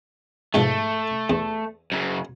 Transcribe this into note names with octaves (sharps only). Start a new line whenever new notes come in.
G#2 B2 F3 A3
E2
F#2 C#3